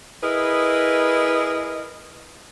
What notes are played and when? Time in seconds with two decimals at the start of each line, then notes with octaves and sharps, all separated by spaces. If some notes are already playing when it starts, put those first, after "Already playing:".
0.23 E4 G#4 A#4 B4 D#5